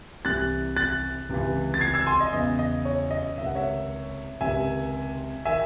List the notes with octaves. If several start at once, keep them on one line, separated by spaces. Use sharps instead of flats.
C2 C3 E3 F#6 A6
F#6 A6
C#2 C3 E3
A6
G#6 C7
E6 G#6
G#5 C6
D#5
E2 C#3 E3 D#5
D#5
C#5
D#5
C#2 C3 D#3 E5
F#5
C#5 E5
C#2 C3 D#3 E5 G#5
D#3 E5 G#5